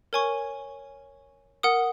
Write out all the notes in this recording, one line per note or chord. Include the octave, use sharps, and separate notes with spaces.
A#4 C#5 G#5 C#6
A#4 F#5 D#6